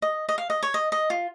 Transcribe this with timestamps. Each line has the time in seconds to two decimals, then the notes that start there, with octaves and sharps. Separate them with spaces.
0.02 D#5
0.29 D#5
0.38 F5
0.50 D#5
0.63 C#5
0.74 D#5
0.92 D#5
1.10 F4